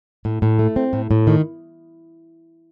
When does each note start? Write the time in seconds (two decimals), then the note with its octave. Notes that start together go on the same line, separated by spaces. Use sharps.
0.25 A2
0.42 A2
0.59 A3
0.76 C4
0.93 A2
1.11 A2
1.27 D#3